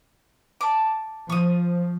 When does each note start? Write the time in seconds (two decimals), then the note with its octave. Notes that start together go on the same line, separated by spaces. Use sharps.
0.61 A5 D6
1.30 F3 C#6 D#6